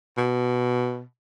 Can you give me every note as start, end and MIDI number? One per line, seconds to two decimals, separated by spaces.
0.17 1.02 47